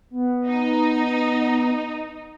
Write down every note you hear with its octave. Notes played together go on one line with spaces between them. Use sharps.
B3
D#4